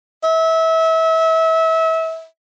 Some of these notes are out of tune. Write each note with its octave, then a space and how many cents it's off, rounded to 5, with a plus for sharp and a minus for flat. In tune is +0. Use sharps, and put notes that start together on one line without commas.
E5 -30